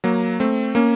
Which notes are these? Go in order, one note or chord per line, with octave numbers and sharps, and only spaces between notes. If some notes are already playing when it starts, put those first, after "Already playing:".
F#3 A#3
A3 C4
A#3 C#4